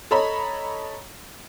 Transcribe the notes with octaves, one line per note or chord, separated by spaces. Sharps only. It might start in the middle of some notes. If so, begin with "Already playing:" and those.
A4 C#5 D#5 A#5 B5